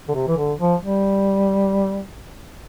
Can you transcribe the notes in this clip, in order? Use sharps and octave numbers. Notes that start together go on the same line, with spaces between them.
D3
C3
E3
D3
F3
G3